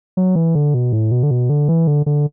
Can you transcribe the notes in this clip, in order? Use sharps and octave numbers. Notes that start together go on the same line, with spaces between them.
F#3
E3
D3
B2
A2
B2
D3
B2
D3
E3
D3
D3